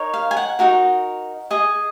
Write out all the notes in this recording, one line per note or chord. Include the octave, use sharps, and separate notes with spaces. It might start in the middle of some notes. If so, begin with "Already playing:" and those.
Already playing: D#4 A#4 C#5
F5
G#5
F#5
D#4 F#4 A#4
G#4 D#5